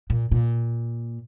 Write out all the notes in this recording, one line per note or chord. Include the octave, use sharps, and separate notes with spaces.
A#2
A#2